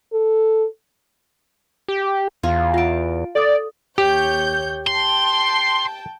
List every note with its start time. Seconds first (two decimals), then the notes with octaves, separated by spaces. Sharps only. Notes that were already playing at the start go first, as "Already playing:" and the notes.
0.13 A4
1.89 G4
2.43 E2 F4 G#5 A#5
2.74 F4 F5 A5 D7
3.35 A4 D5 D#6
3.98 D#2 G4 C#5 G6
4.87 G5 A5 C6